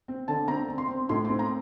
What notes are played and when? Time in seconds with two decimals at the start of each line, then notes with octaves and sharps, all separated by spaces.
0.08 C4
0.28 D3 A5
0.48 C4 A#5
0.68 C4
0.78 C6
0.88 C4
1.09 A2 C6
1.25 C6
1.29 C4
1.39 A#5